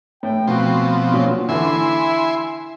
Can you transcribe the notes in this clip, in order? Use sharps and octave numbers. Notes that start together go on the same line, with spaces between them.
A2 G5
B2 F3 C4 F#4
F#4
A#2 F#3 C#4
D3 E3 E4 E5 G#5 C6